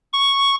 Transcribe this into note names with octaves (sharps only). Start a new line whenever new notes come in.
C#6